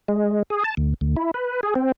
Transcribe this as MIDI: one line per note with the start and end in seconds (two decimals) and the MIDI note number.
0.08 0.43 56
0.50 0.63 68
0.64 0.75 81
0.77 0.94 38
1.01 1.16 38
1.16 1.31 64
1.34 1.61 71
1.63 1.74 68
1.75 1.92 60